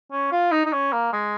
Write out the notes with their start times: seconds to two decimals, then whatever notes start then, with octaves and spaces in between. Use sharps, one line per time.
0.12 C#4
0.32 F4
0.52 D#4
0.65 D#4
0.73 C#4
0.93 A#3
1.13 G#3